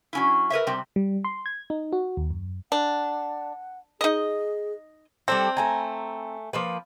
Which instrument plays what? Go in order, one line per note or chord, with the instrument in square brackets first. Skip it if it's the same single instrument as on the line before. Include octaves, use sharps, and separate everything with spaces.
[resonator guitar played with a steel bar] F#3 C#4 E4
A#4 B4 C#5 E5
C3 G3 C4
[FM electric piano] G3
C6
G#6
D#4
F#4
D#2
F#2
[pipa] D4 [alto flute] F#5
[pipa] D#4 D#5 [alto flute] G#4
[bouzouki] G3 D4 A4 [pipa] C4
[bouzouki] A3 G#5 A#5
F3 A#3 B4